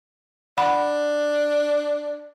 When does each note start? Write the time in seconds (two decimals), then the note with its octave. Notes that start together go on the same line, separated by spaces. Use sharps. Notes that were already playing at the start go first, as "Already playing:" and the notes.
0.58 D4 F#5 B5